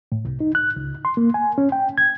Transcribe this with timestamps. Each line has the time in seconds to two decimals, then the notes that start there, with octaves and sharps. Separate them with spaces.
0.12 A2
0.25 C2
0.40 D#4
0.55 F#6
0.76 C#2
1.05 C6
1.17 A#3
1.34 G#5
1.58 C#4
1.72 G5
1.98 G#6